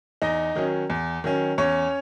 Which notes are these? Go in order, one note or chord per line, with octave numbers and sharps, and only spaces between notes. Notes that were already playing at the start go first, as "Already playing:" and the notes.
E2 D#4 D#5
D#3 F#3 C#4
E2
D#3 F#3 C#4
E2 C#4 C#5